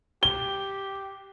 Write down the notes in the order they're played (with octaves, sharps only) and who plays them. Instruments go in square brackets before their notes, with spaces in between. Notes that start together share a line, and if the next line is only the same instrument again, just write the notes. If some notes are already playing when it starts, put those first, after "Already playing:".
[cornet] G4 [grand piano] G7